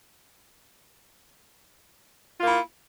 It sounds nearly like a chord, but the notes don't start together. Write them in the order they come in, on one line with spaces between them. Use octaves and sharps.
F4 A#3 E4